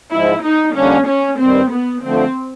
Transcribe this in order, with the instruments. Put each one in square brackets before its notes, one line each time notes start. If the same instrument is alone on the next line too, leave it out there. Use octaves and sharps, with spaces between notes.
[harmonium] G#2 F3 G#3 [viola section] E4
[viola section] D#4
[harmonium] F2 D3 G3 A#3 D4 [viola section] C#4
[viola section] C#4
[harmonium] G2 D#3 G3 [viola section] C4
[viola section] B3
[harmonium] D3 F3 A3 [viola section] C4